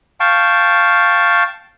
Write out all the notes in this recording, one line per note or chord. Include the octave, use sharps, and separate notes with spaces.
F5 G5 A5 C#6